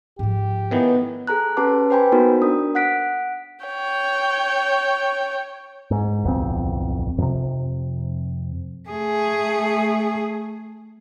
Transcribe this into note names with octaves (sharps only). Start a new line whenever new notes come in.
G#2 F3 G4
A2 D#3 E3 B3
G#4 A4 A#5 F#6
C#4 G4 B4 A5 D6
B4 C5 G5 G#5 B5
A#3 B3 D#4 F#4 A#4 C5
D4 A#4 D#6
F#5 F#6 B6 D7
C#5 G5
G#2
D1 B1 F2 C4
F2 C3
A3 G#4